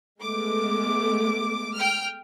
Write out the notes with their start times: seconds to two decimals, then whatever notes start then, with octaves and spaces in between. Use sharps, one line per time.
0.21 G#3 A3 B3 D6
1.75 G5 F6